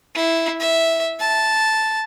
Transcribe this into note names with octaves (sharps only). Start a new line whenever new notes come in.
E4
E5
A5